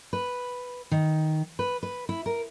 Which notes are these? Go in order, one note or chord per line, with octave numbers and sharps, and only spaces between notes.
B4
D#3
B4
B4
E4
A#4